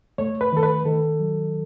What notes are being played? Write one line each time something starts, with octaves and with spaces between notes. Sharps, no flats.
A3 C#5
B4
D#3 A4
B4
D#3 A4
F#3